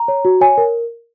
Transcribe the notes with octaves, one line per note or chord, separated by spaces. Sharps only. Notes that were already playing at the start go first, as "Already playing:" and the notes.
Already playing: A#5
C#5
F#4
C#5 G#5
A#4